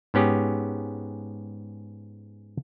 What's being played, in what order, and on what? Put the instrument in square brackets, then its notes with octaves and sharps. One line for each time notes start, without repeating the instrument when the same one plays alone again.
[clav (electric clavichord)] G#2 B3 C#4 G4 G#4